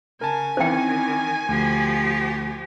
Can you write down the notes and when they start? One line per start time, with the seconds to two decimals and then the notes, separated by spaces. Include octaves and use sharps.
0.21 C#3 A#4 G#5 A5
0.57 D#3 E3 C4 C#4 C5 G5
1.49 D2 F3 G4